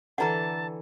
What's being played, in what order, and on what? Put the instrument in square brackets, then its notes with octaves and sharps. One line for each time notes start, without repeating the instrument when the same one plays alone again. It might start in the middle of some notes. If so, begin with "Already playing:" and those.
[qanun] D3 E3 A4 [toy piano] F#5 A#5 [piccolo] A5